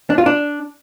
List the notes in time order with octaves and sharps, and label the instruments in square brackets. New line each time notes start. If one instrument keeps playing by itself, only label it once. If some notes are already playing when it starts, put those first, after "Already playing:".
[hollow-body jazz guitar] D4
F4
D4